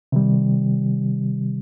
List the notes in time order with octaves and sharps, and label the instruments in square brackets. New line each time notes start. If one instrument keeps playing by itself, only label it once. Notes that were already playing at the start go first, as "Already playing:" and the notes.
[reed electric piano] C3 D#3 G3